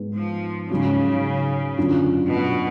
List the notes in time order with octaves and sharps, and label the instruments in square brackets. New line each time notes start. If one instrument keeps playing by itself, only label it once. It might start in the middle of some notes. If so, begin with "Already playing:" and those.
Already playing: [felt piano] G#2 G#3 B3
[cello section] F3
[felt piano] G#2 F#3 C#4 [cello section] C#3
[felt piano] F#2 D3 F#3 C#4 F4
[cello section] B2